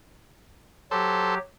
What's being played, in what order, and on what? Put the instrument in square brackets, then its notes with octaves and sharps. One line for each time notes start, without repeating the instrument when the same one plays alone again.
[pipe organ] F#3 G4 [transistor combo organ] A4 C5